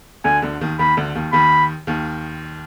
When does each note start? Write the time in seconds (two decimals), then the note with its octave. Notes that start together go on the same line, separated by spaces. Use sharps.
0.24 D2 D3 G#5
0.42 D2 D3
0.61 D#2 D#3
0.79 D#2 D#3 B5
0.97 D2 D3
1.15 D#2 D#3
1.33 D#2 D#3 B5
1.87 D#2 D#3